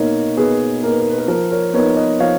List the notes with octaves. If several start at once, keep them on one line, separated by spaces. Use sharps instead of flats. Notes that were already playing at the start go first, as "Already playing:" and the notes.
Already playing: B2 A#3 D#4 C#5
B2 G#4 B4
A#3 D#4 A#4
B4
A#4
B4
A#4
F3 A#4
A#4 C#5
B3 D#4 A#4 C#5
B4 D#5
F3 C#5 F5